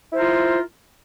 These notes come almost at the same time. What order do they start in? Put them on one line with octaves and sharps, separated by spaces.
E4 C5 A#4 F4